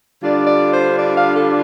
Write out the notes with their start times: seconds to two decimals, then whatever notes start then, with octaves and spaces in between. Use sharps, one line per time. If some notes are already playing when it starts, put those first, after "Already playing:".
0.22 D3 G3 D4 F4 D5
0.47 D5
0.72 C5
0.98 D5
1.15 F5
1.34 A4